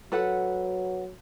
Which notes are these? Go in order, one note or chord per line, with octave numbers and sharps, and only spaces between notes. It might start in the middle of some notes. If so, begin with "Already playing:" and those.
F#3 A4 B4 F#5